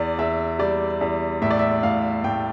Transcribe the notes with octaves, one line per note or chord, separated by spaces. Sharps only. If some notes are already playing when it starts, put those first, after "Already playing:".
Already playing: E2 D5
E2 E5
G3 D5
E2
A2 E5
D5
E5
A2 F5
A2 G5